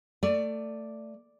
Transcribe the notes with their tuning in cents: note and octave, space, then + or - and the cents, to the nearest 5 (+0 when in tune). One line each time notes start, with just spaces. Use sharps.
A3 +20 D5 +0